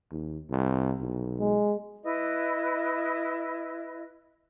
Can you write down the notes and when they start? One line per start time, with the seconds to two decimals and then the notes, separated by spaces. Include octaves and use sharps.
0.11 D#2
0.51 C2
1.01 B1
1.40 G#3
2.03 E4 B4 D#5